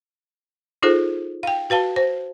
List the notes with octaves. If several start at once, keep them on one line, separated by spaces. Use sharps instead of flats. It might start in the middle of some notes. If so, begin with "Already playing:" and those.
D#4 F4 G#4 A4 C5
F5 G5
F#4 B4 F5 A5
C5